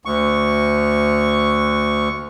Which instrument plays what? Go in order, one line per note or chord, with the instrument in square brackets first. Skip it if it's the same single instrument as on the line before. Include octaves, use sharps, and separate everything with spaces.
[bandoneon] D2 C#6